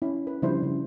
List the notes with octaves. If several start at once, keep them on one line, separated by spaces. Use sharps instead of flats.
C#4 E4
B4
C#3 F3 G3 D4 E4 C5
C#3